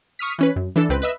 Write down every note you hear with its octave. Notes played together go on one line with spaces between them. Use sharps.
C#6 D#6 F6 B6
E3 C#4 B4
F#2
E3 D4 A4
C#2 C4 B4
B4 D#5 E5